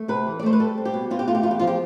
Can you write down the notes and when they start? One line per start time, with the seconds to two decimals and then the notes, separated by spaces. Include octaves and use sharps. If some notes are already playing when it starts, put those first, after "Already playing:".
Already playing: A3
0.08 C3 B4
0.27 E3
0.39 D5
0.43 A3 C5
0.53 B4
0.60 G3 A4
0.78 C4
0.85 G4
0.94 B2
1.11 B2 F4
1.19 G4
1.28 A3 F4
1.35 G4
1.43 E2 F4
1.51 G4
1.59 F3 F4
1.67 G4